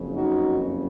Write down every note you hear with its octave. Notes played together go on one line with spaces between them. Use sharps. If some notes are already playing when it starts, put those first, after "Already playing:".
Already playing: F#1 F2 C#3
D#4 F#4